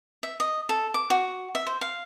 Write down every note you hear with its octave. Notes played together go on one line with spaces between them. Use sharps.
E5
D#5
A4
D6
F#4
E5
C5
F5